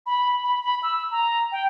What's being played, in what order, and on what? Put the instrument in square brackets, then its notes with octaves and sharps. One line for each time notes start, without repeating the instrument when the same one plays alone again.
[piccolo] B5
B5
B5
E6
A#5
G5